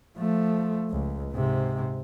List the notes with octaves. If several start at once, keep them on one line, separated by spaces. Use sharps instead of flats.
F3 A3
C#2
G#2 C3